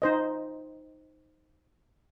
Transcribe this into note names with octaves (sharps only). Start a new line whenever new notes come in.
D#4 C5 D#5